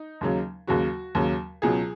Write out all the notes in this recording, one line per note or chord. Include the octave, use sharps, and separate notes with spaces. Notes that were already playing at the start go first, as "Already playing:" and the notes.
Already playing: D#4
D#2 C#3 F#3
D#2 C#3 F#3 F#4
D#2 C#3 F#3
C#2 B2 F#3 G#4